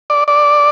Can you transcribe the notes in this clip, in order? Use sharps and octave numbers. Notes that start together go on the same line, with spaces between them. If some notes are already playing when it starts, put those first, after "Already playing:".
D5
D5